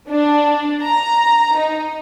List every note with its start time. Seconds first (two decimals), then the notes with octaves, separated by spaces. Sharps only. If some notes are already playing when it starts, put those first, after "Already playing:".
0.11 D4
0.84 A#5
1.57 D#4